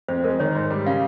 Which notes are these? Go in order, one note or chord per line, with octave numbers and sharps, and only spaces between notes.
F2 C5
G#3 A#4
D#3 C#5
G#2
G3
C#3 F5